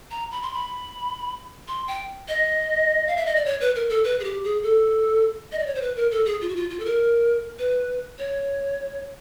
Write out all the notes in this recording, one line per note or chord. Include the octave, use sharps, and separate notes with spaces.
A#5
B5
C6
B5
C6
G5
D#5
F5
E5
D#5
D5
C#5
B4
A#4
A4
B4
G#4
G4
G#4
A4
D#5
D5
C#5
C5
B4
A#4
A4
G#4
F4
F#4
F4
F4
A4
A#4
B4
C#5